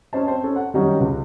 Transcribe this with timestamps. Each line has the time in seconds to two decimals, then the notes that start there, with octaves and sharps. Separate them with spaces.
0.13 C#4 C5 D#5 A5
0.25 C4 C5
0.44 C#4 A4
0.56 F#5
0.74 F#2 D#3 G3 C#4 D#4 F#4
1.00 C#2